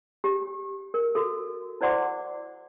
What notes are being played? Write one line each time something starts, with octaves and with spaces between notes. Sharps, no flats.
G4
A#4
F#4 A4
E4 C5 D5 F#5 C6 D6